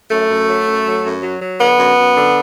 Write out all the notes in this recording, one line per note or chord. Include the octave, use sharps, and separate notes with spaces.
F#2 A3
F#2
F#3
F#2
F#3
F#2
F#3
F#3
D3 B3
F#2
F#2
D3